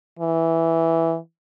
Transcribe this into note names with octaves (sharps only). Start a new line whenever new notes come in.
E3